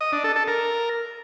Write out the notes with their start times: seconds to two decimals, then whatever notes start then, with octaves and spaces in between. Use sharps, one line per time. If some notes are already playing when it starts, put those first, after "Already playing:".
0.01 D#5
0.12 D4
0.24 A4
0.36 A4
0.48 A#4